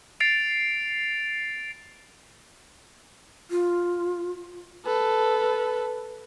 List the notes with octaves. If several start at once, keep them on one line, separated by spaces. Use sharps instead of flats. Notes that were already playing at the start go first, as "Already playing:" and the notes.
A6 C7 D7 F7
F4
A4 B4